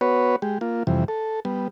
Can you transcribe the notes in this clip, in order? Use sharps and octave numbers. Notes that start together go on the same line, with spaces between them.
B3 F#4 B4 C#5
G#3 G4
A#3 F4
F2 C3 E3 G3
A4
G3 B3